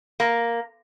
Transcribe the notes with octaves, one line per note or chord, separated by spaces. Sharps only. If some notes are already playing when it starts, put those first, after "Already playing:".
A#3